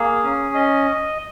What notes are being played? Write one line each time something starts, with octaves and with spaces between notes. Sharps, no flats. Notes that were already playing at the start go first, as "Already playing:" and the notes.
Already playing: A#3 G#4
C#4
D#5